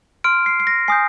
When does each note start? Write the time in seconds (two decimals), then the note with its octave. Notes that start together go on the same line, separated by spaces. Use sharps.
0.24 C6 F6 D7
0.46 C7
0.60 C7
0.67 A#6
0.88 G#5 D#6 G6 C7